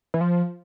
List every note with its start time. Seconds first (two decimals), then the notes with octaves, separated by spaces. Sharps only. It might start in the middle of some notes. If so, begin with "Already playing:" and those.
0.14 E3
0.21 F3